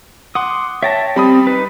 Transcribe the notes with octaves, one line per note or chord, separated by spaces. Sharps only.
F#5 C6 D6 D#6
C#5 E5 G5 A5 A6 A#6
G3 C4 B5 D#6
D#4 B4